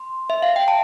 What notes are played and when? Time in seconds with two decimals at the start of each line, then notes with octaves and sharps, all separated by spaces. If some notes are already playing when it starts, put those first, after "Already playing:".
Already playing: C6
0.30 E5
0.42 F5
0.56 G5
0.68 A5